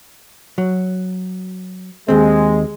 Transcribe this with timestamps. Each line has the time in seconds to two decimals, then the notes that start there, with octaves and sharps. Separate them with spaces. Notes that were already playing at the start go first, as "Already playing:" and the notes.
0.58 F#3
2.08 D#2 G#3 C4